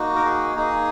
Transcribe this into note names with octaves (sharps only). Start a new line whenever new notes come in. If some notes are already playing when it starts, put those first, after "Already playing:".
Already playing: A#3 D#4 F#4
A#4
G#4
A#3 D#4 G#4